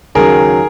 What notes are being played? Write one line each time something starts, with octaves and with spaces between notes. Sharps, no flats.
D#2 C#3 F#3 G#4 A#4